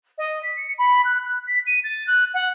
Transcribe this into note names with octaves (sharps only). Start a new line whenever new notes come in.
D#5
B6
C#7
B5
F#6
F#6
B6
D#7
A6
F#6
F#5